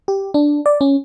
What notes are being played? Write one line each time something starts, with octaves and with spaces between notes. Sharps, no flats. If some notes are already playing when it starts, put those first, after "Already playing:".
G4
D4
D5
C#4